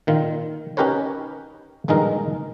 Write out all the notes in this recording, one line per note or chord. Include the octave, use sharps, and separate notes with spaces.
A#2 D#3 F4
C#4 D#4 G4 A#4 B4 C#5
A#1 G2 D#3 G#3 D#4 A#4